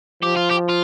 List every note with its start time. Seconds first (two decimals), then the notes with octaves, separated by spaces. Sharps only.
0.23 F3 G4
0.36 F4
0.50 G4
0.69 F4